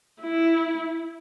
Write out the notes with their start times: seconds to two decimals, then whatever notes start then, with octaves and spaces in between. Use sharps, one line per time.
0.22 E4